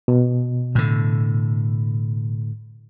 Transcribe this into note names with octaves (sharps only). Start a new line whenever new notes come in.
B2
A2 D3